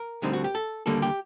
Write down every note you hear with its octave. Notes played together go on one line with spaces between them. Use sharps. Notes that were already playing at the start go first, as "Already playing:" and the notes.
Already playing: A#4
D2 D3 G3 C4 D#4
F#4
G4
A4
D#2 D3 G3 A#3 A4
G4